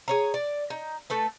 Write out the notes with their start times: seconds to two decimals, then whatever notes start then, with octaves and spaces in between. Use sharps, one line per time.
0.08 G#4 C#5 A#5
0.34 D5
0.70 D#4
1.10 A3 A4 B4